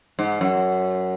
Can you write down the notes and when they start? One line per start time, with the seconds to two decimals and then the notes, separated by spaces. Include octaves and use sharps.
0.19 G#2
0.41 F#2